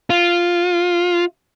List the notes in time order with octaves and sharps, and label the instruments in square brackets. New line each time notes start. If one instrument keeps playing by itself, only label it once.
[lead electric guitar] F4